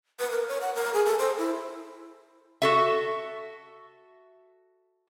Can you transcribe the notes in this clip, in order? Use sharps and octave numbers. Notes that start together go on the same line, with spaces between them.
B4
A#4
C#5
F#5
A#4
G#4
A4
C5
E4
F#4 A4 E5